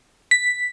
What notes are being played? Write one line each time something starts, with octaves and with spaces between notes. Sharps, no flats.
B6